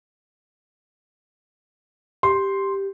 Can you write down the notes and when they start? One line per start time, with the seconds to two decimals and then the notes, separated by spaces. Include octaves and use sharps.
2.23 G4 C6